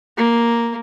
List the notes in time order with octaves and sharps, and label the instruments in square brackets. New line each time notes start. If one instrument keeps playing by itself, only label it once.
[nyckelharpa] A#3